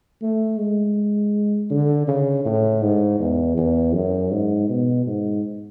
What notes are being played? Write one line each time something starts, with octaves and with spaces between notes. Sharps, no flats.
A3
G#3
D3
C#3
A2
G#2
E2
E2
F#2
G#2
B2
G#2